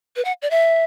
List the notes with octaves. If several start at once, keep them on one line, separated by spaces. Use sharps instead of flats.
B4
F#5
D5
E5